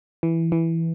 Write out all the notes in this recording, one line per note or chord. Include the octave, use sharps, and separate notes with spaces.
E3
E3